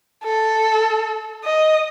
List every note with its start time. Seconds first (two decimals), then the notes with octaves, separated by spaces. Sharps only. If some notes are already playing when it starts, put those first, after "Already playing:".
0.24 A4
1.44 D#5